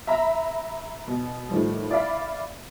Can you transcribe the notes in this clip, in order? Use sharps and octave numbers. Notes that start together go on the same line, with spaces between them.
E5 A#5 B5
B2
A2 D#3 F3 G3
E4 D5 E5 F5 B5